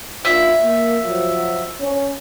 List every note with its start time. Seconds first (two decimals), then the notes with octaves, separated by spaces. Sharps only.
0.25 A#3 D4 F4 E5
0.63 A#3
1.04 F3 F#3
1.80 C#4